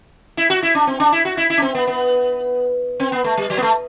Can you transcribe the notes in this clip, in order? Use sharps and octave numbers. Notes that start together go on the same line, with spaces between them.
E4
F#4
E4
D4
C4
D4
E4
F#4
E4
E4
D4
C4
B3
B3
C4
B3
A3
G3
F#3
B3
A3